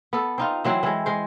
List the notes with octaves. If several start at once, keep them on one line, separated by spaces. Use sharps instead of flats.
B3 A4
C4 D#4 F4
E3 F#3 C4 C5
E3 G#3
G#3 C5